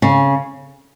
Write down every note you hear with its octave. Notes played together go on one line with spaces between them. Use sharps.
C#3